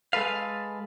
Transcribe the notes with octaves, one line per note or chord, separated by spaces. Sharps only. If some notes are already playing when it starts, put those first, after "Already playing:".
G#3 A4 B4 F5